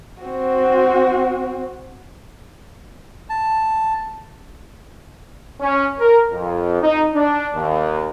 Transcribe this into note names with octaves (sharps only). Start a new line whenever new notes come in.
C4 F#4
A5
C#4
A#4
F2
D#4
D4
D#2